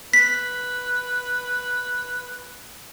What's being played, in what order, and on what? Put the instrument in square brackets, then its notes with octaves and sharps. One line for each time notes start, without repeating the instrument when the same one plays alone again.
[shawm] B4 [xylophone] B6